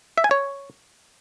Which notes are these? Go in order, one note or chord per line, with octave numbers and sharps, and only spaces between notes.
E5
G#5
C#5